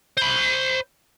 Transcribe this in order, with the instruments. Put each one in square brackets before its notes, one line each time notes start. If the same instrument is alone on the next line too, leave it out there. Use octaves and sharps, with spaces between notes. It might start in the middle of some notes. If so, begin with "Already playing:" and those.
[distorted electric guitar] C5 B5